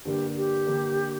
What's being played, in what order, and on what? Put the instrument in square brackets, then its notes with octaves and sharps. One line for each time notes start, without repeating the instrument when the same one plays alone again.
[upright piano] G2 D3 A#3 [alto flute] G4
[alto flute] G4
[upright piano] D3 A#3